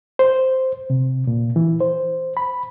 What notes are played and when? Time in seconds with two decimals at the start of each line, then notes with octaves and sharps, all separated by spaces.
0.19 C5
0.90 C3
1.27 A#2
1.56 E3
1.81 C5
2.37 B5